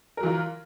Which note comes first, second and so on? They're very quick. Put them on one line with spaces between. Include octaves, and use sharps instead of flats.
A#4 F#3 E3 F4